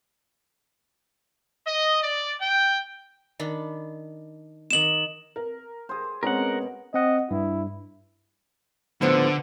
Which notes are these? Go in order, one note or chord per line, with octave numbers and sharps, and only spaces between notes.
D#5
D5
G5
D#3 D4 B5
D#3 D#5 D6 E7 F#7
A#4
G#4 C5
B2 G#3 C4 C#4 A#4 F#5
C4 D#5 F#5
G2 E4
A2 D3 F3 B3